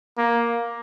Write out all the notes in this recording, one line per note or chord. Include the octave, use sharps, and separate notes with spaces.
A#3